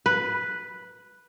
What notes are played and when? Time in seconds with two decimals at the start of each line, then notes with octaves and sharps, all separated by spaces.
0.06 B4